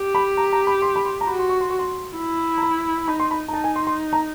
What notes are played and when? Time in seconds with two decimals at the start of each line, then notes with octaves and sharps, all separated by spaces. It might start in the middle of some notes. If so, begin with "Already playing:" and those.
Already playing: G4
0.15 B5
0.37 A#5
0.52 A#5
0.67 B5
0.82 C6
0.96 B5
1.05 C6
1.21 A#5
1.27 F#4 B5
1.39 C6
1.49 C#6
1.61 C6
1.70 C#6
1.79 C6
2.17 E4
2.58 A#5
2.63 B5
3.08 D#4 B5
3.20 C6
3.31 B5
3.48 A#5
3.52 D#4 A5
3.64 G#5
3.76 C6
3.87 C6
4.13 A#5